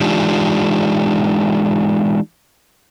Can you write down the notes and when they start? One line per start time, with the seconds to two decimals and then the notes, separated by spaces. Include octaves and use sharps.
0.01 E3 G#3 D4 D#4 F4 G4